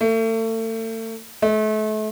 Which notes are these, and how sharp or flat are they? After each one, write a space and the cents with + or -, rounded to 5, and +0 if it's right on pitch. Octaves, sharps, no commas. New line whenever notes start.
A3 +35
A3 -35